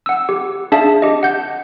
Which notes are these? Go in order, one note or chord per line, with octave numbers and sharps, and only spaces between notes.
F#5 E6
G4
D4 G#4 E5 F5 A5
G4 D#5
F#5 G6